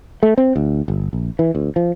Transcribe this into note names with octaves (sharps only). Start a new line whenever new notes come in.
A3
C4
D2
G1
A#1
E3
D2
F3